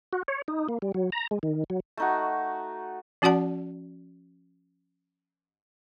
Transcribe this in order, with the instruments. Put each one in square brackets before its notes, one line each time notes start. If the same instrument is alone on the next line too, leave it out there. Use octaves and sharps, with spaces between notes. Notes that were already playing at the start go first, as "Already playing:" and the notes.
[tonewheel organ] F#4
C#5
D#4
A#3
G3
F#3
A#5
G#3
D#3
F#3
[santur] A3 D#4 F#4
[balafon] F3 C#4 F#4 D5 F#5 A5